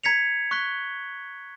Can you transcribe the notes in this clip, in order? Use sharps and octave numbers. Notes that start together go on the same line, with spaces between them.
A#5 G#6 B6 C#7 F7
C#6 F#6 B6 G7